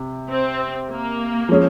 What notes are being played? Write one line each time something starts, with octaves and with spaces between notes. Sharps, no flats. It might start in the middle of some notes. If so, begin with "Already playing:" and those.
Already playing: C3
C4
A#3
F3 G#3 C#4 G#4